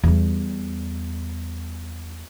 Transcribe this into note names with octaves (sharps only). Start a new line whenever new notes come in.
E2 G3